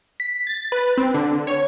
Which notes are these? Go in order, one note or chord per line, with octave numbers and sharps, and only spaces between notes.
B6
A6
B4
C4
D3
C#5